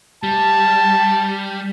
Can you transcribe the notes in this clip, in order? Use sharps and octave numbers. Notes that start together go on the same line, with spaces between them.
G3 A5